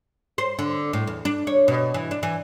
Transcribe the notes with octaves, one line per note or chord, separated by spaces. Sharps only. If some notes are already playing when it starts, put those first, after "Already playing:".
C5
D3
A2
E2
D4
C#5
B2
E3
D4
E3